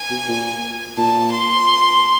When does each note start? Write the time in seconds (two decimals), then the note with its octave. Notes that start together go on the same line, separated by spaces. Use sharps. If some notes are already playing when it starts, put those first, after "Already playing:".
Already playing: G#5
0.10 B2
0.28 A#2
0.97 A#2 A5
1.33 C6